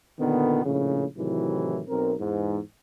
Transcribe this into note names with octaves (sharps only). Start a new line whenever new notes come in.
A#2 D3 D#3 B3
A#1 A2 C#3
A2 C3 D#3 E3 F#3
B1 C4 A#4
E2 G#2